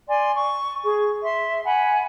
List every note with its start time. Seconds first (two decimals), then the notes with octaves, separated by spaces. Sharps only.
0.08 D5 G#5 C6
0.33 C#6
0.84 G#4 C#6
1.23 E5 C6
1.65 F#5 G#5 B5